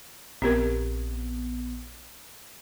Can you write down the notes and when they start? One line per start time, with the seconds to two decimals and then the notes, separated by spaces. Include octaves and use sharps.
0.42 A#1 B3 C4 G4 A#4